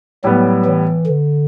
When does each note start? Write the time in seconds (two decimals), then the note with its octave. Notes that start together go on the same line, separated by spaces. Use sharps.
0.24 A2 F#3 G3 B3
0.65 E3
1.07 D3